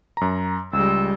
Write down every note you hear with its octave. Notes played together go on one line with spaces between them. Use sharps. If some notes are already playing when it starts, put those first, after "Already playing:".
F#2 A#5
C#2 G3 G#3 E6